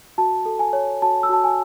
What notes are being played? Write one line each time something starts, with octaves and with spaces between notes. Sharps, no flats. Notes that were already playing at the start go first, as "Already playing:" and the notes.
F#4 A5
A4
G#5
C#5
F#4 A5
E6
F#4 A5
G#5